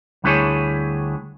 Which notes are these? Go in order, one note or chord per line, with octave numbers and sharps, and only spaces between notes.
D2 G3 D4 E4 G#4 C#5